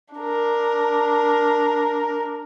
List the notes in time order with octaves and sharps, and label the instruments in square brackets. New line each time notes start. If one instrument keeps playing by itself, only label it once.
[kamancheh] D4 A#4